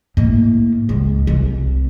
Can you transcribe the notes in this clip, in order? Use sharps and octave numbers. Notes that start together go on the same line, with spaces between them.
A2 A#3
C#2
C2